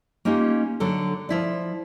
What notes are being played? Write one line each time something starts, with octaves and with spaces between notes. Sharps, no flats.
A#3 C#4 D#4 F4 G4
D3 F#3 A4
F3 E4 D5